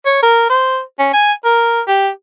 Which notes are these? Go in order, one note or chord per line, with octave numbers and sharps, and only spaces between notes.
C#5
A#4
C5
C#4
G#5
A#4
G4